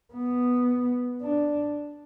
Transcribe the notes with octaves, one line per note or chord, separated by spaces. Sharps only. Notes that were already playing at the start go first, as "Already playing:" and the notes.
B3
D4